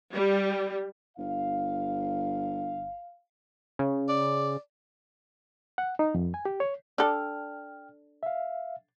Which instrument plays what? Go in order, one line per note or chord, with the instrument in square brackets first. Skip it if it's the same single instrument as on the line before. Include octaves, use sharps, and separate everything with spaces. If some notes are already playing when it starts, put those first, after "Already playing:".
[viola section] G3
[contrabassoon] G1 [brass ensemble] F5
[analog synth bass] C#3
[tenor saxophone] D5
[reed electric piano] F#5
D#4
F2
G#5
G4
C#5
[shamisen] D4 A4 [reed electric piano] G5 F6
[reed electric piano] E5 F5